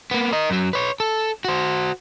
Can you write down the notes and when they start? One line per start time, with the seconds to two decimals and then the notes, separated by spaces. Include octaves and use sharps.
0.11 A#3 B3
0.33 A#4 D#5
0.50 F#2 F#3
0.73 B4 C#5
1.00 A4
1.45 F#4 C5